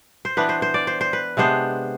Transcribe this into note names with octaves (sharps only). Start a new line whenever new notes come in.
C5
E3 B3 D4 B4
C5
C5
D5
C5
C5
B4
C3 G#3 B3 D4 C5